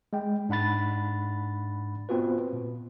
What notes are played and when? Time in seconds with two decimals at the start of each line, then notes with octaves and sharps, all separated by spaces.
0.13 G#3 G5
0.49 G#2 D4 F#5 B5 A6
2.09 B3 C4 F4 F#4 B4
2.53 A#2